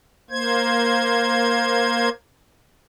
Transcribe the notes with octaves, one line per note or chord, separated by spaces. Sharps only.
A#3 C5 G#6